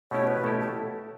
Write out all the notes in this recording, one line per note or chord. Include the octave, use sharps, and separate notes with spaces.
B2 A3 C#4 E4 G4 C#5
B4
B2 A3 C#4 E4 G4 A4
A4